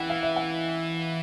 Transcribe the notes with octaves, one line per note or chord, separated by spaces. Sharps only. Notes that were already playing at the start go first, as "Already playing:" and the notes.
Already playing: E3 F#5 G5
F5
E5
F#5